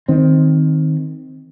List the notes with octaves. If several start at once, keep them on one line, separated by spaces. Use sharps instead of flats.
D#3 C4